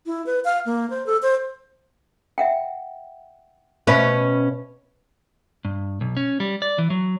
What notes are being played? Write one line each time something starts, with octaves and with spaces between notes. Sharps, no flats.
E4
B4
F5
A#3
C5
A4
C5
E5 F#5 G5
B2 C#4 B4 C5 E5 B5
G2
B1
C#4
G3
D5
E3
F#3